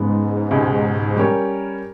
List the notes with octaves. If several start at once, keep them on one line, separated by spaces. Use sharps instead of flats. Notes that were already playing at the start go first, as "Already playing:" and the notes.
Already playing: G#2 C#3 G#3 B3
C#2 B2 G#3 C#4 G4
G3 C#4 G4 A#4 C#5